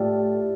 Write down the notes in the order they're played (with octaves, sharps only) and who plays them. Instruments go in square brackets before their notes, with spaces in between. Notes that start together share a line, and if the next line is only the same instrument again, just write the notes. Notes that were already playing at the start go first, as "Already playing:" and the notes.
Already playing: [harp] A2 F4 G4 A4 D5